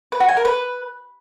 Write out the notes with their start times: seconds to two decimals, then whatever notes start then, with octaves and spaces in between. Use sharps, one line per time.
0.12 B4
0.20 F#4
0.28 G#5
0.37 A#4
0.45 B4